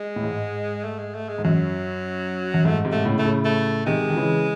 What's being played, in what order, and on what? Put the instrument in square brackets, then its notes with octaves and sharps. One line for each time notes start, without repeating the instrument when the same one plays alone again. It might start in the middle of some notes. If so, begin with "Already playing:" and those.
Already playing: [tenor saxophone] G#3
[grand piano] A2
G#2
[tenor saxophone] A3
G#3
A3
G#3
[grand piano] G#2
[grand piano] F#2 [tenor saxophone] F#3
[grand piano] F#2
[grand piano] G#2 [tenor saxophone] A3
[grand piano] G#2 C3
[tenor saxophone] A3
[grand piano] A2 C#3
[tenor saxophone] A3
[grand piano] A2 C#3
[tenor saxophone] A3
[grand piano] C3 D#3 [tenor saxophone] G#3
[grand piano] D#3
C#3 E3